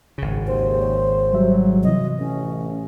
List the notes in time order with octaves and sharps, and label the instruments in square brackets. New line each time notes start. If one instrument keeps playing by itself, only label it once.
[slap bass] G#1 C#3
[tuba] D#2 [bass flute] C5
[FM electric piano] C#5
[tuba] F#3 [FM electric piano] G3 E5
[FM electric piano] C3 E3 [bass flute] D#5
[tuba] A1 [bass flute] C#4